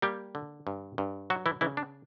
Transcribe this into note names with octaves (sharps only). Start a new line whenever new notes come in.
G3 A#3 G4
D3
G2
G2
F#3 F#4
E3 E4
C#3 E3 E4
D4